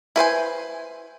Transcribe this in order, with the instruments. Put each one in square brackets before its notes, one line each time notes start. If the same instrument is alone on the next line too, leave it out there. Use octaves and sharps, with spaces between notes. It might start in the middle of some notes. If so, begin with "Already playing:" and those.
[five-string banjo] E4 B4 C5 G#5